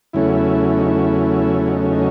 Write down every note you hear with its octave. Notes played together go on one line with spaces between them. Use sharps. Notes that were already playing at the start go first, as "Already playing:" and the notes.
E2 C#3 F#3 A3 C#4 E4
D#4
E4
E4
D#4
D#4